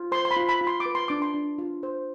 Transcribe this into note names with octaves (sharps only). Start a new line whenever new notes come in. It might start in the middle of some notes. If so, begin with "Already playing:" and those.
Already playing: F4
C5 C6
C6
B5
F4
B5
F4
C6
D6
B4
C6
D4 D6
C6
D4
F4
C5